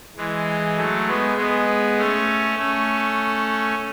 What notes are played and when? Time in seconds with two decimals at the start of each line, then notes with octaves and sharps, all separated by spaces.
0.17 E3 G#3
0.77 F#3 A3
1.07 G#3 B3
1.37 G#3 B3
1.98 A3 C#4
2.58 A3 C#4